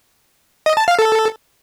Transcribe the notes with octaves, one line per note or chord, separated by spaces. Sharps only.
D#5
A5
F5
A4